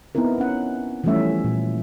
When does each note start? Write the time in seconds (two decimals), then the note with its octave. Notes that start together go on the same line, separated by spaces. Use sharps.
0.15 B3 C4 D#4 E4 A#4
0.38 C#4 F#5
1.04 E3 F3 G3 A3 C#4 E5
1.44 A#2